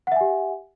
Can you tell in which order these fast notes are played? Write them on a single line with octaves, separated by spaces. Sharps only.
F#5 E5 G#5 G4